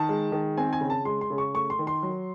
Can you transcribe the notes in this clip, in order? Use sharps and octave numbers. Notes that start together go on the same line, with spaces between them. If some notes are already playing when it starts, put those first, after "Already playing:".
Already playing: D#3 A5
G#3
D#3
C4 G#5
G#5
C#3
A5
G#3 C6
C6
C#3
C#6
A3 C#6
C6
D#3
C6
F#3